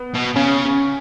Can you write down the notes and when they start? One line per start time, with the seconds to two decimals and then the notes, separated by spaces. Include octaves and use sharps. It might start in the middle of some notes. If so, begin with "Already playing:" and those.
Already playing: B3
0.15 B2
0.36 C#3 C#4
0.66 C#4